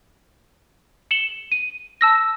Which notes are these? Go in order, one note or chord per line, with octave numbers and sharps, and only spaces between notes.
C#7 E7 F#7 G7
D#7
A5 E6 A#6